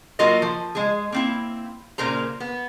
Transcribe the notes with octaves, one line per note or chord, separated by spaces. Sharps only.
F#3 A#3 F4 F#4 A#4 D#5
F3
G#3 G#4
A#3 C4 E4
A#2 C#3 A#4 C5 A#5
B3